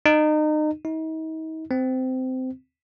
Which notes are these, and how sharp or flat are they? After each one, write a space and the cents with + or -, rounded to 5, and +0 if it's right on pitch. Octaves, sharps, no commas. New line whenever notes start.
D#4 -30
D#4 +40
C4 -20